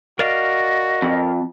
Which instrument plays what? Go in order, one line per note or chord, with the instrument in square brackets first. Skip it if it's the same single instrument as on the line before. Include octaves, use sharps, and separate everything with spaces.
[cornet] F#4 [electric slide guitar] A#4 D5 F5 [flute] D#5
[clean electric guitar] F2